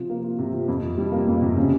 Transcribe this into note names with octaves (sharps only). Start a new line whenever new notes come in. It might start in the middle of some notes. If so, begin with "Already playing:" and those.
Already playing: C3 F3
A#3
F4
C3
F3
F2
C3
G3
A#3
F2
C3
C#3